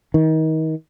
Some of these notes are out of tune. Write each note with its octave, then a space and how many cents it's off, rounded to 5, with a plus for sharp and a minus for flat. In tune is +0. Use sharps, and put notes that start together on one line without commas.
D#3 +30